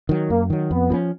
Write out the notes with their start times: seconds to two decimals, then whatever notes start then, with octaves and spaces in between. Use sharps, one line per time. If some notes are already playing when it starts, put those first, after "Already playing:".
0.09 D#3 F#3
0.30 F#2 A#3
0.50 D#3 F#3
0.71 F2 B3
0.90 F3 A#3 C#4